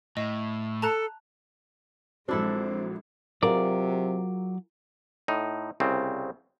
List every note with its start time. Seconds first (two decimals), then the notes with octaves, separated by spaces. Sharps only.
0.17 A2 D#5
0.82 A4 A5 A#5 F#6
2.29 A#1 F#3 G#3 C4 D4 E4 A4
3.43 C3 F#3 F4 G#4 A#4 D5
5.28 A2 D#4
5.80 C2 C#3 C4